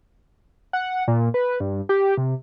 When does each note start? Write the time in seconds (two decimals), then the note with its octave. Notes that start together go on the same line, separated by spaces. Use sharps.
0.73 F#5
1.08 A#2
1.34 B4
1.60 G2
1.89 G4
2.18 C3